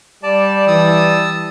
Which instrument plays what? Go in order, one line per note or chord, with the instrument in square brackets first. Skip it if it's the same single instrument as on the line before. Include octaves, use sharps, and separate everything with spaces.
[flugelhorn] G3 [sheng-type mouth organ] D5 A5
[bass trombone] E3 [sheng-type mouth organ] A5 D#6 E6